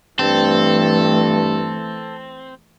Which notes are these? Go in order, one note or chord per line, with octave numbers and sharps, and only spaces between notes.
G2 E3 A3 C4 A4